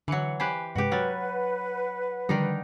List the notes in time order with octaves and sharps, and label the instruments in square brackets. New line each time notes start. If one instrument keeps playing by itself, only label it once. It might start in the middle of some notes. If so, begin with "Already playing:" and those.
[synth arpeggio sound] D3 C#7 [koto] E3 F#3
[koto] G4 B4 C5 [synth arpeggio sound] G#5 B5 F#6
[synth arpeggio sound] G2 C3 G#3 [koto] F#4 G4 [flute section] B4 F#5
[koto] F#3 [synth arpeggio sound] F6 A6
[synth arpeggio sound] D3 F3 G3 [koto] D#3 D4 D#4